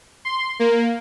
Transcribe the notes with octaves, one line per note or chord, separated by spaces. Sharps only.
C6
A#3